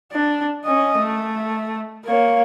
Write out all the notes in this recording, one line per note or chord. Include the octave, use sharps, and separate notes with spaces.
D4
C#4 D#5
A3
A#3 C#5